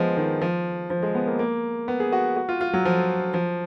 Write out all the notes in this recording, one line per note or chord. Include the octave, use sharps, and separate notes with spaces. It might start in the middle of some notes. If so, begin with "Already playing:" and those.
Already playing: F3 G#3 B3
D#3
F3
F3
G#3
B3
A#3
A#3
B3
G#4
F#4
F#4
F4
F4
F#3
F3
F3